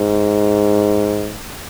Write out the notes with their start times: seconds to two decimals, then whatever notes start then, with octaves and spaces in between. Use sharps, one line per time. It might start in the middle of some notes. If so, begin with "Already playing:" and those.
Already playing: G#2